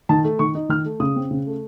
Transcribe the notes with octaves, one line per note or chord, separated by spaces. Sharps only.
D#3 A5
A3
D#3 C#6
D#4
D#3 F6
A3
C#3 D#6
C4
C#3
A3